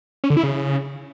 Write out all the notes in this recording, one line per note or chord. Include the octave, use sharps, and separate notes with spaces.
C#4
D3
E4
C#3